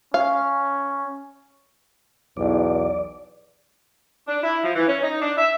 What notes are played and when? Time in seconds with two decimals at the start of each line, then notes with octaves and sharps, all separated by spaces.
0.14 C#4 F5
2.37 B1 E2 D5
4.28 D4
4.43 E4
4.63 F3
4.76 E3
4.87 C#4
5.03 D#4
5.22 D4
5.38 E5